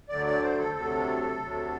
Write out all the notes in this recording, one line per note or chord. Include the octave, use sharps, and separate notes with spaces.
D2 D3 F#3 D5
D5
C5
A4
D2 C3 F#3 A4
D2 C3 F#3